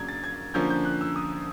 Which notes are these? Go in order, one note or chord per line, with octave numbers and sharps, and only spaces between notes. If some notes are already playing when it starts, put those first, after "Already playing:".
Already playing: C#3 F#3 A#3 D4 G#6
A6
G#6
D3 F3 A#3 C#4 G6
G6
F#6
E6
D#6